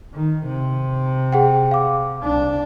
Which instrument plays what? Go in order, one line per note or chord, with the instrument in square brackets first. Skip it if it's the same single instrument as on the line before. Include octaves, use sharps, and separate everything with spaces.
[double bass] D#3
C3
[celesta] G#4 F#5 G5
F5 D6
[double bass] C2 D4